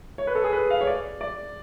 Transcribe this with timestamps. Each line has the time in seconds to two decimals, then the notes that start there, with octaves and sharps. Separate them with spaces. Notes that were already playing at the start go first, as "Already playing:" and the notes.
0.18 C#5
0.27 B4
0.35 A4
0.44 G#4
0.53 B4
0.70 F5
0.81 C#5
0.87 D5
1.21 D5